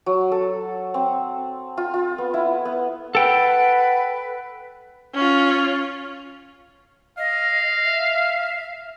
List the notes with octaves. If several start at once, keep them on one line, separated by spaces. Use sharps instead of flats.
F#3
A4
C4
F4
F4
B3
E4
B3
A4 B4 F#5 G5
C#4 F4
D#5 F5
E5